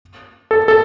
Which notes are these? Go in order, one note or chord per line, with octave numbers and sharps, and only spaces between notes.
A4
A4